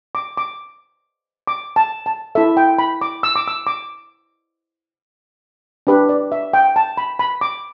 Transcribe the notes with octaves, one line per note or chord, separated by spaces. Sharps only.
D6
D6
D6
A5
A5
E4 A4 E5
G5
B5
D6
E6
D6
E6
D6
D4 G4 B4
D5
E5
G5
A5
B5
B5
D6